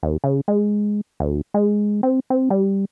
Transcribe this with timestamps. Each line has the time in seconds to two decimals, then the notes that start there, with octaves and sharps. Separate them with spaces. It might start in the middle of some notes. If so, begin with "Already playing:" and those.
0.03 D#2
0.24 C#3
0.48 G#3
1.20 D2
1.54 G#3
2.03 C4
2.30 C4
2.50 G3